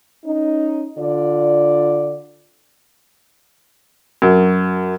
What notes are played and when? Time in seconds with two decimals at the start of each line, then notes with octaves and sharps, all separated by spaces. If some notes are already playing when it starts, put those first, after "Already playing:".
0.25 C#4 D#4
0.97 D3 F4 D5
4.22 F#2